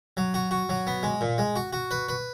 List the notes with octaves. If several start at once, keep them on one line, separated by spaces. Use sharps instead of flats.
F#3
F#4
F#4
F#3
B3
G#3
A#2
G#3
F#4
F#4
B4
B4